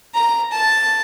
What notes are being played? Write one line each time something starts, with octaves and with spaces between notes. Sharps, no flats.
A#5
A5